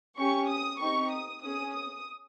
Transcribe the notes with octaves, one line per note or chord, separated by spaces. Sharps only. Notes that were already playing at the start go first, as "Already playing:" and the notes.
C#4 G4 C#6
D#6
C4 D#4 G4 C#6
D#6
C#4 G#4 D#6
D#6